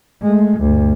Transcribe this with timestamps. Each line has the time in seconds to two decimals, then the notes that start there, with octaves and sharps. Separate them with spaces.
0.23 G#3 A3
0.61 D2 G2